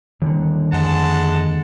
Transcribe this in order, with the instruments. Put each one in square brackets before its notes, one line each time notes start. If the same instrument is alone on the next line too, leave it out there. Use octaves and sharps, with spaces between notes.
[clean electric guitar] D#2 D3 [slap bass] E3 G3
[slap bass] F2 [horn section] G#3 F#5 A5